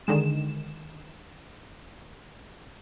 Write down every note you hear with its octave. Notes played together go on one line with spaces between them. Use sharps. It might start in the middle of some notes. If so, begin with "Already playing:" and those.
D3 D#3 G#3 E7